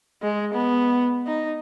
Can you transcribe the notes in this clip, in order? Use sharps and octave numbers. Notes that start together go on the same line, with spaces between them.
G#3
B3
D#4